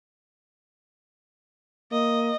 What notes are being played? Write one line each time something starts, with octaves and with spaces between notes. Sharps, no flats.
A#3 D#5